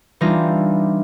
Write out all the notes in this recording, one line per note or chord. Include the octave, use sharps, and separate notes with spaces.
E3 G3 D4 D#4 F4 A#6